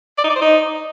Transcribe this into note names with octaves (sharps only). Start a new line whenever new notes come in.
D5
D#4
D5
C5
D#4